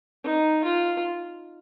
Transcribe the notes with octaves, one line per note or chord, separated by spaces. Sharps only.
D#4
F4